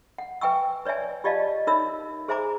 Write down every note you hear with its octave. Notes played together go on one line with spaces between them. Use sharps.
F#5
B4 E5 G5 G#5 C#6 E6
B4 C#5 D5 E5 G#5
F4 G4 D5 D#5 F5 A5
D#4 A#4 C#5 E5 B5 E6
G#4 C5 E5 G#5 A#5 D6